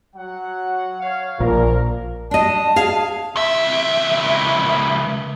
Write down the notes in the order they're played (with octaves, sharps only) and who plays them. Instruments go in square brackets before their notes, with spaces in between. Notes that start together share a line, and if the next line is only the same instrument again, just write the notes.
[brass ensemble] F#3 F#5
C#5 F5
[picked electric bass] A#1 [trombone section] A#2 [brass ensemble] A#4
[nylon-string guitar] D4 D#5 [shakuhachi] A5
[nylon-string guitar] G#4 F5
[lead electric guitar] C#2 E5